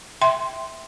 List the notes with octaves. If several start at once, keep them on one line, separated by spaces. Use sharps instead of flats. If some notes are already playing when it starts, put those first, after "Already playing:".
E5 G5 C6